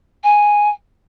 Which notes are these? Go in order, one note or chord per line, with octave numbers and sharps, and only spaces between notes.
G#5